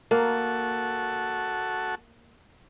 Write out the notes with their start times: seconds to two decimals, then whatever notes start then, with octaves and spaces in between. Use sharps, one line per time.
0.11 A#3 F#4 A4